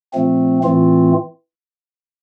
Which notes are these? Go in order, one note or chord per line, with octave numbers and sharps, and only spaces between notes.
A#2 F3 A3 C4
A2 E3 A3 C4 F4